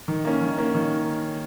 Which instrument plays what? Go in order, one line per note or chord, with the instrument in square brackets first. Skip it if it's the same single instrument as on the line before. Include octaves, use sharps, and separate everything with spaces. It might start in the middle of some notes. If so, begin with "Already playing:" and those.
[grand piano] D#3
A#3 C#4
D#3
A#3 C#4
D#3